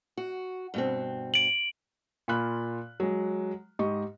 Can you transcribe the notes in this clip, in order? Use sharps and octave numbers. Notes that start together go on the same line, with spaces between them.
F#4
G2 B2 C4
D7 F#7
A#2 F4 B5 F#6
F#3 G#3
G#2 G4 D#5 C#6